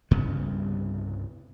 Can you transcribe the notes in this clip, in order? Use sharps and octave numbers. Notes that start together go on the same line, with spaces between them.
C2 G2 C#3 B3